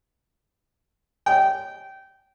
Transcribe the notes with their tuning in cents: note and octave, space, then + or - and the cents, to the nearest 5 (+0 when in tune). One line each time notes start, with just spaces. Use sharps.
G5 -20